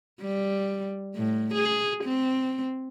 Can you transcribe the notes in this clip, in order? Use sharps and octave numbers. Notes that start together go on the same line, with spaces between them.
G3
A2
G#4
C4